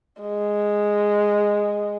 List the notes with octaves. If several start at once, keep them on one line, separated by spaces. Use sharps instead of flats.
G#3